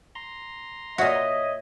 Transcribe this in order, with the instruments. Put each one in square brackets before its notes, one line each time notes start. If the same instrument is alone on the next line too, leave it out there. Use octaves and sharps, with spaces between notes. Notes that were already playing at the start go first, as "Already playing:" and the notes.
[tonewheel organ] A#5 C6
[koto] A#2 F#4 [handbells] C#5 E5 [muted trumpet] D#5